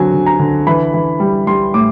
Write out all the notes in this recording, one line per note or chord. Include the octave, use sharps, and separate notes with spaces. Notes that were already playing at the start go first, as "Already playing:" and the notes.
Already playing: D3 F#3 C4 G#5
D3
A#5
D3
E3 B5
E3
G3
G3 C6
A2 D6